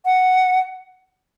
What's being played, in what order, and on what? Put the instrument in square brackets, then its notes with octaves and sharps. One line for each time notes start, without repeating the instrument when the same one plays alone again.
[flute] F#5